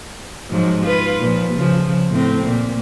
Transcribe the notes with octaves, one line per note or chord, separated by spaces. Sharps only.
G#2 F3 F#3
F4 B4
A#2 F3
C#3 F3
A2 C4
A#2